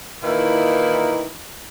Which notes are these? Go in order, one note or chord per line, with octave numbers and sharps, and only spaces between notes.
A#2 D#3 E3 D#4 E4